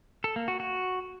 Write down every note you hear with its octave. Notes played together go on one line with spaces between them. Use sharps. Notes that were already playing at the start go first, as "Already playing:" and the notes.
A4
A#3
F#4
F#4